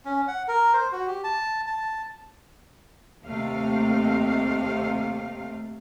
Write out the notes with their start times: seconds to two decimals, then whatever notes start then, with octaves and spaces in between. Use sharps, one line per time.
0.05 C#4
0.28 F#5
0.48 A#4
0.74 C5
0.92 F#4
1.07 G4
1.24 A5
1.67 A5
3.24 D#2 C3 A3 F5